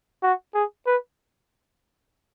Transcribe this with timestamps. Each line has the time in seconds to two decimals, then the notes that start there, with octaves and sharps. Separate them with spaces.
0.23 F#4
0.54 G#4
0.87 B4